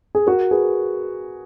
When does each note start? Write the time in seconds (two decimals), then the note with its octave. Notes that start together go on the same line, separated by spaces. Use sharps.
0.15 G#4
0.27 F#4 A#4
0.51 G#4 B4